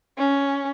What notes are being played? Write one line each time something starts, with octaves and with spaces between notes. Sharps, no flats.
C#4